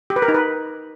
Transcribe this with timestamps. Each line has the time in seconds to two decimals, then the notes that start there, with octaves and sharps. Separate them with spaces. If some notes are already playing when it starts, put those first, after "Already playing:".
0.10 G4
0.16 B4
0.22 A#4
0.28 D#4
0.34 B4